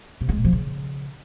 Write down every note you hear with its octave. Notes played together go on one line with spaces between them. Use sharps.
C3
G#3
A#2
F3
C#3